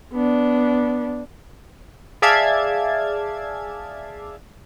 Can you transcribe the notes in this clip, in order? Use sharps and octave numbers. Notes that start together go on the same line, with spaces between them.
B3 D4
G#4 D5 E5 F5 A5 G#6